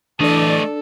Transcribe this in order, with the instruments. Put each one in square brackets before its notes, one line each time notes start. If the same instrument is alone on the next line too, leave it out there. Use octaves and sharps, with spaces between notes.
[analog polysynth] E3 D5 [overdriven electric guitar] A3 D#5 [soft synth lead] D4 [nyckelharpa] A4